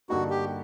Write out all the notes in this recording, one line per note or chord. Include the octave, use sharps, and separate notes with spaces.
G2 D3 G3 A#3 D#4 F#4
G4